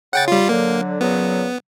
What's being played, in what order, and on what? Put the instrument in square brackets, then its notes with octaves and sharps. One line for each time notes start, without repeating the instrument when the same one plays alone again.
[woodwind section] C#3 [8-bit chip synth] F#5 G5 A6
[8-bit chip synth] G3 F4
[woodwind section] D3 F#3 [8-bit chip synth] A#3
[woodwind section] A#2 C#3 F#3 [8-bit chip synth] B3